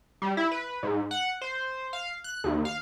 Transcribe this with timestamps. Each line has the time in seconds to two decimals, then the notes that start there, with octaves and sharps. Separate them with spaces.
0.22 G3
0.37 E4
0.51 B4
0.83 G#2
1.11 F#5
1.41 C5
1.93 F5
2.24 F#6
2.44 D#2
2.65 F5